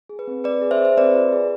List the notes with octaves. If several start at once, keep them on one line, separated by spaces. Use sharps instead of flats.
G#4
B4
C4
C4 B4 D5
G#4
C5 E5
G#4
C5
C4 B4 D5
F4
G#4